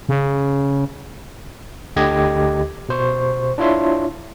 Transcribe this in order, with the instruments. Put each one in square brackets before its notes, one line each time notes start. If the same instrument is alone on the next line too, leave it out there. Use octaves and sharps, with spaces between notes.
[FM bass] C#3
[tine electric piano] D2 D3 G4 D#5 G#6
B2 C5 C#6
D4 E4 F4 C#5 E5 C6